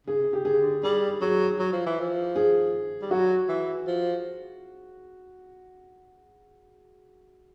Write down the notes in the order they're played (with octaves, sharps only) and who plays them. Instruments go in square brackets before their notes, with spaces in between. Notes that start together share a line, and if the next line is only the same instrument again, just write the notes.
[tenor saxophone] C#3 [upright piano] G#4
[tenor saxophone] C3
[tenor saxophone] C#3 [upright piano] G4
[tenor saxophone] D3 [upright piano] G#4
[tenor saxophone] C#3
D3
[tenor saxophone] G3 [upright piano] G#4
[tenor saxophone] F#3 [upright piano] G#4
[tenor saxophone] F#3
F3
E3
F3
[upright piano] G#4
[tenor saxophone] G3
[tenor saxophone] F#3 [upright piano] F#4
[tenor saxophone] E3
F3